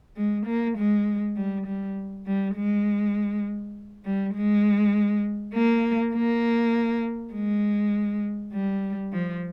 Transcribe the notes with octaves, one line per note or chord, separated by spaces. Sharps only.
G#3
A#3
G#3
G3
G3
G3
G#3
G3
G#3
A#3
A#3
G#3
G3
F3